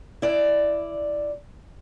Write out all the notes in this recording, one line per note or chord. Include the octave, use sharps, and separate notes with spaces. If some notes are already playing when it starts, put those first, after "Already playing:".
E4 D5